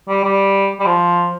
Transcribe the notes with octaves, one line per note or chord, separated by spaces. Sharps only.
G3
G3
G3
F3